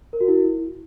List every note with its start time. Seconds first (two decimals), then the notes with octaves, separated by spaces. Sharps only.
0.13 A#4
0.21 F#4
0.28 E4